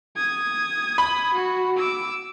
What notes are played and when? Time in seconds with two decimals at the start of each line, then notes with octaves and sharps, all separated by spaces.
0.16 D#6 G#6
0.98 B5
1.33 F#4
1.76 D6 E6